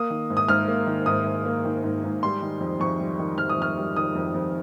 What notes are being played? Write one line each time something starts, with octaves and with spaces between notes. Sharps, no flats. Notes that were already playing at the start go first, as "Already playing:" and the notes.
Already playing: A#3 D#6
D#3
G#2
D#6
G#2 F6
A#3
D#3
G#2 D#6
G#2
A#3
D#3
G#2
G#2
G3 C6
D#3
F2
F2 C#6
G3
D#3
F2 F6
D#6
F2 F6
G3
D#3 D#6
F2
F2